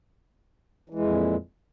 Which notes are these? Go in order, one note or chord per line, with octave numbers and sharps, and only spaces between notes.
F2 A#2 E3 G#3